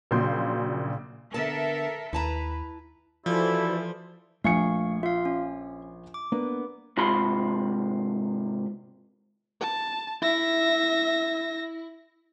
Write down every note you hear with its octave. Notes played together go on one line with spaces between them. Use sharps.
A#1 A#2 C#3 F#3 C6 G6
D3 B3 A4 A#4 E5 A5
D#2 E4 B4 A5 A#5
E3 F3 E4 F#4 A4 C5 D5
A#1 A3 F5 G#5 C#6 C#7
F4 E5 F5
C#4
D6
A#3 B3 D4
G#2 C3 F4 B5 C6
A5
E4 E5 A#6